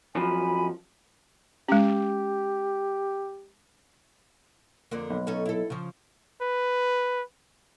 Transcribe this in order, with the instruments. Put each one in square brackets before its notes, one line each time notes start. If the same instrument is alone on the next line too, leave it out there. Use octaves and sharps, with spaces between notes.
[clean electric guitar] F#2 F3 F#3 [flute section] G#5 B5
[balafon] G#3 C#4 [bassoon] G4
[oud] F2 D3 A#3
[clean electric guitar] B1
[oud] C#4 D#4 A4
E4 A4
C#3 F3
[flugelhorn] B4